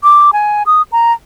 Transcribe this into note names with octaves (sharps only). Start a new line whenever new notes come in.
D6
G#5
D#6
A#5